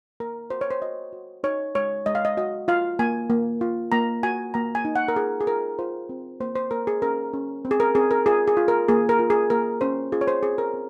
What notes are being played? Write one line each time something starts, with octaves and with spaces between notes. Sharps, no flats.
A#3 A#4
F#4 C5
C#5
C5
F#4 D#5
F#4
D#4 C#5
G#3 C#5
G#3 D#5
F5
D#5
F#4 D#5
F4 F5
A#3 G#5
A#3
F4
A#3 A#5
F#4 G#5
A#3 A#5
G#5
D#4
F#5
A#4
F4 G#4
G#4
F4 A#4
F4 C5
C4
A#3 C5
C5
A#3 A#4
G#4
C#4 A#4
C#4
C4
G#4
A#4
C4 G#4
A#4
F4 G#4
G#4
F4
A#4
A#3 G#4
A#4
F4
G#4
A#3 A#4
C#4 C5
F4 G#4
C#5
C5
C4 G#4
A#4
C4